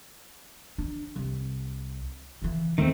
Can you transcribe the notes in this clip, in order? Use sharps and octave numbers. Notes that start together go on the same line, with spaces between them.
D4
C2
C#3 E3
E2 D#3 A3 C4